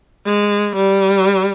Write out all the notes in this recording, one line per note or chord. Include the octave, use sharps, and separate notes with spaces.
G#3
G3